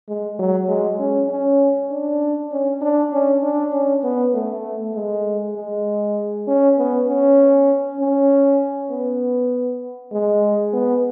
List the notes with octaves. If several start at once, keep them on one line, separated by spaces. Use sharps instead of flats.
G#3
F#3
G#3
C#4
C#4
D4
C#4
D4
C#4
D4
C#4
B3
A3
G#3
G#3
C#4
B3
C#4
C#4
B3
G#3
B3